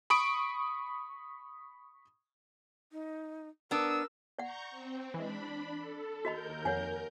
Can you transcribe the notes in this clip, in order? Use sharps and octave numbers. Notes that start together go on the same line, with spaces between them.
B5 C#6 D#6 D7
D#4
B3 D4 A#4 E6
D5 F#5 A#5 C#6 G6
C4
E3 G#3 D4 B5
A4
D#2 F#4 A#4 D#5 B5 G6
F2 C#5 F#5 G#5